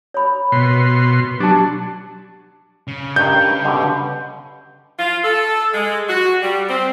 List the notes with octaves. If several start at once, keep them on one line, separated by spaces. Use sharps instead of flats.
C#5 B5
B2 C6
F#3 D4 G4 A5
C#3
G2 D#3 G6
G2 B2 D3
F4
A4
G#3
F#4
G3
C4